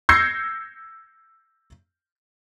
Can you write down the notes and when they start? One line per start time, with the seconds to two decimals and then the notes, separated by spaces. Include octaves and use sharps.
0.09 E6 G6 G#6 A#6 C7 C#7